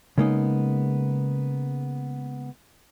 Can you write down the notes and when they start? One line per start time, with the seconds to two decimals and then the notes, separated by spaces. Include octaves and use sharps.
0.18 C#3 G#3 A#3 B3 D#4